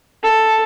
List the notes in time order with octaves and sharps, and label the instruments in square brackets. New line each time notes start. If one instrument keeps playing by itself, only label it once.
[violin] A4